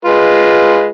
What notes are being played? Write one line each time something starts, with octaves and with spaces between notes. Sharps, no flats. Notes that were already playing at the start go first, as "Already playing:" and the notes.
G#3 F4 B4